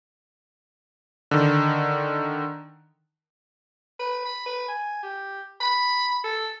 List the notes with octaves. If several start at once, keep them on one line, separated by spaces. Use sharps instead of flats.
D3 D#3
B4
B5
B4
G#5
G4
B5
A4